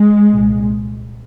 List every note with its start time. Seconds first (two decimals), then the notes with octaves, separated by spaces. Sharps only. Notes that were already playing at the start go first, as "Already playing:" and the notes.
Already playing: G#3
0.30 C2 A#2